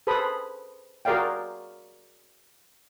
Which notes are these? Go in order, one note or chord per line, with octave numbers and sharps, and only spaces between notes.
G#4 A4 B4 C5 B5 D#6
F#4 G#4 A#4 D5 F5 G5